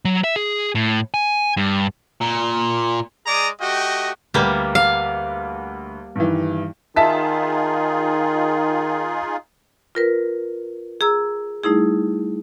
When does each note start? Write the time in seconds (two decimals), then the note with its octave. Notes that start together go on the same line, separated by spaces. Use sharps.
0.05 F#3
0.24 E5
0.36 G#4
0.75 A2
1.14 G#5
1.57 G2
2.21 A#2
3.27 G#3 G#4 D5 A#5 D6 D#6
3.61 A3 F#4 G4 D#5 G5
4.34 D2 G3 A#3 B4
4.75 F5
6.16 G2 D#3 E3
6.96 D#3 D#4 F4 G#4 E5 A5 B6
9.95 F4 A#4 B4
11.01 G#4 A#5 E6
11.64 G3 A3 D#4 E4 G#4